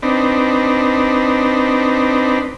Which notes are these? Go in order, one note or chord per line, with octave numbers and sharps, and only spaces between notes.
C4 D4 D#4 B4